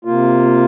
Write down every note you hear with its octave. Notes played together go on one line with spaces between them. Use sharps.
C3 A#3 F4